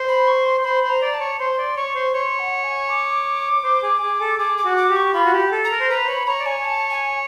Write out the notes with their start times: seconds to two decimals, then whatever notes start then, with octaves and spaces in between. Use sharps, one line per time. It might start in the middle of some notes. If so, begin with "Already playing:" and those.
Already playing: C5
0.08 B5
0.27 C#6
0.45 C6
0.64 C5 B5
0.83 C5
0.89 A#5
1.02 D5
1.14 A5
1.20 C#5
1.40 C5 C6
1.58 D5
1.77 C#5 C#6
1.95 C5
2.14 C#5 C6
2.39 F#5
2.64 G#5
2.89 D6
3.64 C5
3.83 G#4
4.02 G#4
4.20 A4
4.39 G#4 D6
4.58 D6
4.64 F#4
4.77 D6
4.90 G4
4.96 C#6
5.14 F4 B5
5.25 F#4
5.33 G4
5.51 A4
5.64 A#5
5.71 A#4
5.80 C5
5.90 B4 A#5
6.03 C5
6.08 C#5 B5
6.27 C#5 A#5
6.40 D5
6.46 C#5 G#5
6.64 A5
6.90 G#5